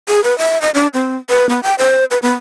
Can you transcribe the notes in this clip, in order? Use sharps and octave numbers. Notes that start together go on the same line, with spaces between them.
G#4
B4
E5
D#5
D4
C4
B4
B3
G5
C5
B4
B3